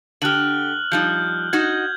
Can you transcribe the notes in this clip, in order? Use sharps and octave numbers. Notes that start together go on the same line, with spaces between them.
D3 G4 F6 F#6 F#7
F3 G3 D#4 G6
D#4 F#4 G#6